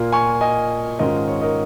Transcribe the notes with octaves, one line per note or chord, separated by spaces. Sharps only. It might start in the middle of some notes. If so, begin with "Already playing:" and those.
Already playing: A#2 A#3 F4
G#5 C#6
D#5 G#5
G#2 D#3 C#4 F4 A#4 D#5
C#5
A#4 D#5